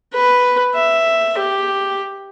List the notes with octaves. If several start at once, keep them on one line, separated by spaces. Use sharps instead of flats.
B4
E5
G4